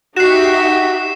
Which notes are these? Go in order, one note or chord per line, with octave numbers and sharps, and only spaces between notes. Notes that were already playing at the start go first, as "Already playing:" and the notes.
D#4 F#4 G4 E5 C7 E7